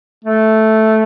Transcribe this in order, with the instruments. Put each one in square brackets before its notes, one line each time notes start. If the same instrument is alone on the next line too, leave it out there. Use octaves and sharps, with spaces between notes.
[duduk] A3